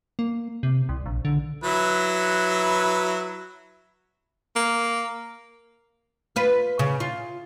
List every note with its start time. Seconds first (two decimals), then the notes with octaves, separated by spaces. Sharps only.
0.19 A#3
0.63 C3
0.89 C2
1.06 A#1
1.25 D3
1.64 F#3 E4 B4
4.56 A#3
6.36 F4 B4
6.79 C#3
7.00 F4